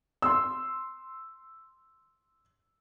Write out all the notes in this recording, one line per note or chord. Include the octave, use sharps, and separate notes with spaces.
C6 E6